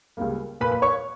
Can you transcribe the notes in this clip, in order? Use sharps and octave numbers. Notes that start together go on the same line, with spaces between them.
C#2 C#3 G3 A#3
A#2 A#3 B4 B5
B4 B5
C#5 C#6